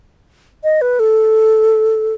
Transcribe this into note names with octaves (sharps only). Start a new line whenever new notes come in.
D#5
B4
A4